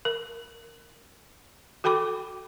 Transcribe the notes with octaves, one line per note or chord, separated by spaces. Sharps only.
A#4
F#4 A4 G5 B5 D6